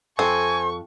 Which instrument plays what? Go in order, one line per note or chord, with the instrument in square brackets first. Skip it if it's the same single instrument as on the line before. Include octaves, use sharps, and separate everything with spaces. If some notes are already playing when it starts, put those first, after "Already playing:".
[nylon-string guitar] F2 A4 [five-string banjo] C4 [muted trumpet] G#5 [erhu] C#6